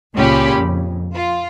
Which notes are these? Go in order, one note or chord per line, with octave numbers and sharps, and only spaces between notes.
C#2 A#2 C#3 C#4 G4 B5
F2
F4